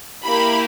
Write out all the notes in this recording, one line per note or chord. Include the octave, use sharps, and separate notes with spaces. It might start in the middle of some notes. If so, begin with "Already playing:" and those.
A#3 E4 G4 B5